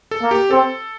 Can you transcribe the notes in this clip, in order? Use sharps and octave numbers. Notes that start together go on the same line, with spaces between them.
A4
A#3
G4
C4 A4